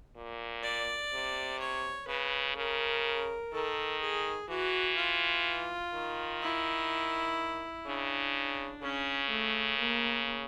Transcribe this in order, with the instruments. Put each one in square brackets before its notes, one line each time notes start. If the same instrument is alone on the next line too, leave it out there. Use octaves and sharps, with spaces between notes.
[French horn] A#2
[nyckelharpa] D5
[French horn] C3
[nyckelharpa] C#5
[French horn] C#3 [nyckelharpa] B4
[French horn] C#3 [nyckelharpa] A#4
[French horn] D#3 [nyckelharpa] A4
[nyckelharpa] G#4
[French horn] E3 [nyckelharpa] F#4
[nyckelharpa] F4
[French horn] D#3
[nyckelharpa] E4
[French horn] C#3 [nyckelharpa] D4
[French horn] C#3 [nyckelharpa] C#4
[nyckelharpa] A3
A#3